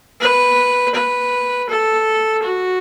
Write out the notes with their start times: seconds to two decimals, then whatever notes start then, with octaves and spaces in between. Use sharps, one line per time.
0.21 B4
0.95 B4
1.69 A4
2.43 F#4